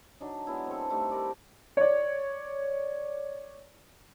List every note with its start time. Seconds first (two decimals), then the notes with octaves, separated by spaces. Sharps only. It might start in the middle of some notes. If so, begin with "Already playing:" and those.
0.20 F#3 D4 D#4
0.47 F#3 G#3 B3 E4
0.67 C4 A4
0.90 G3 A3 D#4 E4
1.11 G4 A#4 D5
1.77 C#5 D5